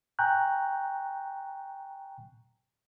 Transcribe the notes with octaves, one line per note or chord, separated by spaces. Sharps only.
G5 G#5 A#5 C#6 F#6 G6